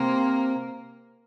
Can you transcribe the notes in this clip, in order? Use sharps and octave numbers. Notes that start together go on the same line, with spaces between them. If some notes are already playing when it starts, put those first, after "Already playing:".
Already playing: C3 A#3 C4